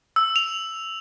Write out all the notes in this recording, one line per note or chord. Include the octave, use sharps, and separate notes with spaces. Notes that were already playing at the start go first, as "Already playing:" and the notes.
E6
F7